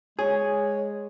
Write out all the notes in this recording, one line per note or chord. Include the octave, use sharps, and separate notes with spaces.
G#3 G#4 C#5